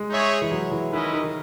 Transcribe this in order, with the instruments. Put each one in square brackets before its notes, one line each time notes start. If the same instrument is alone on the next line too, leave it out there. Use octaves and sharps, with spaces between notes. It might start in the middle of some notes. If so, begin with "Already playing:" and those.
Already playing: [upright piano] G#3
[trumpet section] D#4 G#4 C#5 E5
[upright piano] E3
F#3
E3
[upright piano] D#3 [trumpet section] G#3 C#4 E4 B4 D#5
[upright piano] D#3
D#3